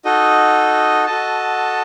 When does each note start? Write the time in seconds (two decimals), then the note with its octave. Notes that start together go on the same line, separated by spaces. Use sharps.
0.05 D#4 F#4 A4 D#5
1.06 F#4 A4 D#5 A5